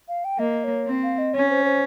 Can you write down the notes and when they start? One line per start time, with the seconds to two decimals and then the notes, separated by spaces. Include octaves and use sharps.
0.08 F5
0.25 G5
0.39 A#3 D#5
0.64 C#5
0.87 C4
1.03 F5
1.18 D#5
1.34 C#4 C#5
1.50 C5
1.66 C5